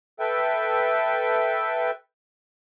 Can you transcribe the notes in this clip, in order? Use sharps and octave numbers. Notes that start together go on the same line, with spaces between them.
A4 B4 E5 G5